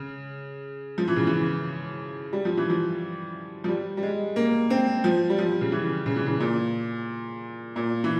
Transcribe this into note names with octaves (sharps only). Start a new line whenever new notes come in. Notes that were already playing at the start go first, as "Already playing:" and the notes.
Already playing: C#3
F3
E3
C#3
E3
G3
F3
E3
F3
F3
G3
G3
G#3
A#3
C4
F3
G3
F3
C#3
E3
C#3
E3
C#3
A#2
A#2
E3